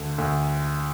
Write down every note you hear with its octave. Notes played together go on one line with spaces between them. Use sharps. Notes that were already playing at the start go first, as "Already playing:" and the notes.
Already playing: D2 D3
D2